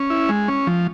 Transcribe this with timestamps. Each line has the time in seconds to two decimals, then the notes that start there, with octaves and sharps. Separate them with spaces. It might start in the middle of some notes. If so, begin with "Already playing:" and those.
Already playing: C#4
0.10 E4
0.29 G#3
0.48 C#4
0.67 F3